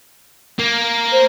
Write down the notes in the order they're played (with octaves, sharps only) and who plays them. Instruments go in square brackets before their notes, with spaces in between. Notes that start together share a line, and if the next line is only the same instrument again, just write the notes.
[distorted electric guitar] A#3
[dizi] C5